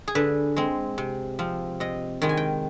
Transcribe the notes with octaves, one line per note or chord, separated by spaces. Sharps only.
G#4
D3 B4
G#3 C4
C3
F3 C4
C3 D#5
D#3 G#3 G5
G#5
G5